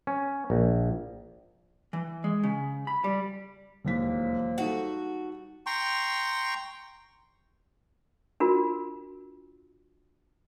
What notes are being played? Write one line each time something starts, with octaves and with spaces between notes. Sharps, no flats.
C#4
A#1
E3
G#3
C#3
B5
G3
E1 D#2 F3 F#3 A#3 B6
G3 D#4 F#4 A4
G5 A#5 C6 C#6
D4 F4 F#4 A#4